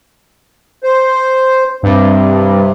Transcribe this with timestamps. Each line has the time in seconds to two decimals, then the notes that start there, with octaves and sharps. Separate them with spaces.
0.83 C5
1.83 G2 C3